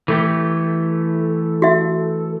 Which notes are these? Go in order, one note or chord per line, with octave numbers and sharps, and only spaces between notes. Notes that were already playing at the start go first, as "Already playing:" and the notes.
E3 A3 G4 A4
F#4 E5